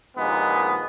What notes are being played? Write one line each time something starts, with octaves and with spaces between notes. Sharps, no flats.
A#1 D#2 G#3 A#3 B3